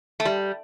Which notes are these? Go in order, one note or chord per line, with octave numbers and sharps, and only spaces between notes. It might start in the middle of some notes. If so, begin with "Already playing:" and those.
A3
G3